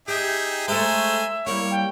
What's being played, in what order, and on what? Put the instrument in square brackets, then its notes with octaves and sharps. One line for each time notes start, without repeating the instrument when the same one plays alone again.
[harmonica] D#4 G#4 E5 [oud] G4 [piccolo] G6
[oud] G#3 A3 [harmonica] C5 G#5 A#5 [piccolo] E5
[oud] G3 A#3 E4 [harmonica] C#5
[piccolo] G5